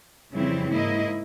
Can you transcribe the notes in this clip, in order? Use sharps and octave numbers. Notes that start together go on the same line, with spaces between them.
F2 C#3 E3 G3 C4 E4
G#2 A#3 E4 D#5